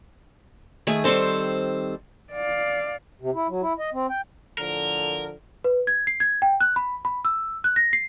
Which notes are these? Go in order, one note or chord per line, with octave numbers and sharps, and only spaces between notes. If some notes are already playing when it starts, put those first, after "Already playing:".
D#3 A3 G#4 G#5
D#3 G3 C4 A4 C5
D5 F5
C3
E4
F#3
E4
D#5
C4
G5
A2 D3 F3 A#4
B4
G#6
C7
G#6
G5
F#6
B5
B5
E6
F#6
A#6
C7